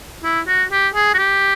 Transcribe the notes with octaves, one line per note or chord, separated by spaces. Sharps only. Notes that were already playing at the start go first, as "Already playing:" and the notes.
E4
F#4
G4
G#4
F#4
G4